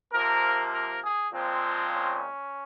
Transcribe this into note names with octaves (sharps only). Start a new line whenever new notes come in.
C3 F3 A#3 A#4
A#4
G#4
A#2 F3 G#3 C4
C#4